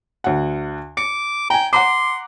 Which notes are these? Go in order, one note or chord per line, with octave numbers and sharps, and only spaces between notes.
D2 F#5
D6 C#7
G5 G#5 A#5
F#5 A#5 C6 D6